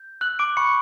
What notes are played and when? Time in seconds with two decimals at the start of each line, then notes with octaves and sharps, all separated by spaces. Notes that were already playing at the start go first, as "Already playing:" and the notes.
Already playing: G6
0.21 E6 F#6 F#7
0.39 D6 D7
0.57 B5 C#6 C#7